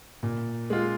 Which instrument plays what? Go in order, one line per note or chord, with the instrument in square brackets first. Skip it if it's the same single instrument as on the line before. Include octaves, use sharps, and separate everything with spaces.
[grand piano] A#2
G#3 F4